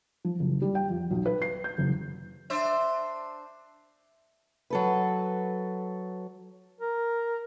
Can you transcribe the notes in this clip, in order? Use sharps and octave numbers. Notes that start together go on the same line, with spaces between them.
F3
F#1
G3
G5
F2
B1
B4
C7
G6
F#1
D4 C5 E5
F#3 A4 B4
A#4